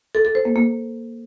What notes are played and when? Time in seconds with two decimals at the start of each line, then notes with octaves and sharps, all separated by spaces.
0.15 A4
0.25 A4
0.35 C5
0.45 A#3
0.56 A#3